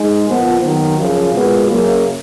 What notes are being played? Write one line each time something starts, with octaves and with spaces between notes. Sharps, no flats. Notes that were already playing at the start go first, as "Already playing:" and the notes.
Already playing: G#3 D#4
A#2 F3 B3
D#2 D#3 F#3 B3
F#2 C#3 F3
A#2 G#3 B3 F#4
F#2 C#3 F#3 A#3